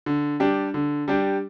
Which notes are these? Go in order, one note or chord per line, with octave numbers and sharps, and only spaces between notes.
D3
G3 D4 G4
D3
G3 D4 G4